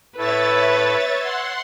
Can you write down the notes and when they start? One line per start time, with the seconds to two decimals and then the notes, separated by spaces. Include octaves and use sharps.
0.18 A2 E4 A4 B4 C#5 E5 A6
1.19 F#5 C6 E6 G#6